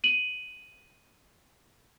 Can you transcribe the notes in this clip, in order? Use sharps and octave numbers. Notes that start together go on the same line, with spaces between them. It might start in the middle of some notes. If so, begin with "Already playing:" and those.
D#7 F#7